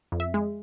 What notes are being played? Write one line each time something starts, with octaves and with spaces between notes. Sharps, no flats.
F2
E5
G#3